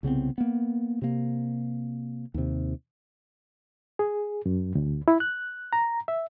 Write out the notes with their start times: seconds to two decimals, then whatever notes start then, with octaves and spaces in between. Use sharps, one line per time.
0.03 C2 C#3 B3 C4
0.38 A#3 B3
1.02 C3 A#3
2.34 D#2 C3
3.99 G#4
4.46 F#2
4.75 D2
5.08 E4
5.20 F#6
5.73 A#5
6.08 E5